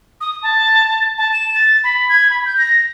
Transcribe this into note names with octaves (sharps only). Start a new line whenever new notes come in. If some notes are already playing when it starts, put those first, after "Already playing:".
D#6
A5
A5
E7
A6
B5
G#6
B5
G6
A#6